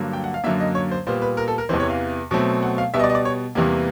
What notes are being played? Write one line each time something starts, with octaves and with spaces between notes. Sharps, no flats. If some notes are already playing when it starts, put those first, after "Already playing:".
Already playing: G2 D3 F#3 A#3
G5
F#5
F5
F#2 D3 F#3 A#3 E5
D#5
C#5
C5
A#2 G3 B3 C5
B4
A#4
A4
A#4
E2 C3 E3 C5
C#5
F5
B2 F#3 A3 C4
F#5
F5
B2 G3 B3 E5
D#5
D5
D#5
D5
C#5
E2 C3 E3 G3 A#3